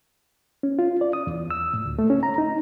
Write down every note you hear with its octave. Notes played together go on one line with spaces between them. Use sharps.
C#4
F4
D5
D#6
E2
E6
A2
D2
A3
C#4
A#5
D#4